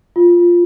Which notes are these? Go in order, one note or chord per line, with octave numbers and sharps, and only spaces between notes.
F4